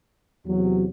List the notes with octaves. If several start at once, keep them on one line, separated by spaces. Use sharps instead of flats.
E2 C3 F#3